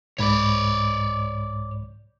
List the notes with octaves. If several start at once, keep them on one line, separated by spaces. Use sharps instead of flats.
C2 G#2 C#5 D5 B5